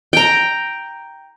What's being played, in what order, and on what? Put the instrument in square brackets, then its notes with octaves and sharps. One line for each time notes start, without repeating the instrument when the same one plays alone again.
[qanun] G5 A#5